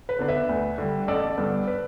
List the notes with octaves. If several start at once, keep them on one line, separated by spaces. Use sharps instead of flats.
B4
D3 B3 D4
B4 E5
D2
D3 G3
A1 A4 D5
G2 D3 B3
B4